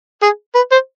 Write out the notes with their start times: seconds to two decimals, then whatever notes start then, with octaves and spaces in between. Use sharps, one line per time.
0.22 G#4
0.55 B4
0.72 C5